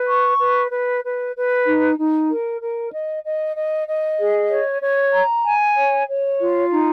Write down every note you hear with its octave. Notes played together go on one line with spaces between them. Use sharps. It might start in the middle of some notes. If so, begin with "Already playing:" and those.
Already playing: B4
C#6
B4
B4
B4
B4
D#4
D#4
A#4
A#4
D#5
D#5
D#5
D#5
G#4
C#5
C#5
A#5
G#5
C#5
C#5
F4
D#4